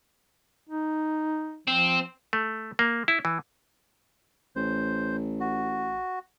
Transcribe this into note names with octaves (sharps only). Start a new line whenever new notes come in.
D#4
F3 C4
A3
A#3
E4
E3
A1 C5
F#4